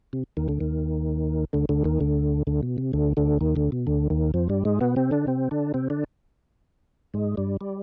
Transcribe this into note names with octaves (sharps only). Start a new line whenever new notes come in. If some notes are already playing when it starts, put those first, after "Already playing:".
C3
D#2 D#3
D2 D3
D#2 D#3
D2 D3
D2 D3
D#2 D#3
D2 D3
D2 D3
B2
C3
D2 D3
D2 D3
D#2 D#3
D2 D3
B2
D2 D3
D#2 D#3
F2 F3
G2 G3
G#2 G#3
B2 B3
C3 C4
D3 D4
C3 C4
D3 D4
C3 C4
D3 D4
G#2 G#3
G2 G3
G3